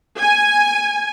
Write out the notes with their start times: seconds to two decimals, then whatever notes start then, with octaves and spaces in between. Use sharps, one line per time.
0.21 G#5